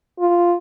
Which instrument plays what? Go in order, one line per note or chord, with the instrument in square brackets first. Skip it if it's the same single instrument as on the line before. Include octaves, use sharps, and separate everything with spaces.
[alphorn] F4